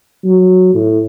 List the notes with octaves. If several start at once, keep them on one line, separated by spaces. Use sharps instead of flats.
F#3
A2